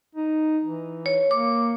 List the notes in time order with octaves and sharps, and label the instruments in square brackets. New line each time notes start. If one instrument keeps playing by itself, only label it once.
[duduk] D#4
E3
[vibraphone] C#5
[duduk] A#3 [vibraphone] D6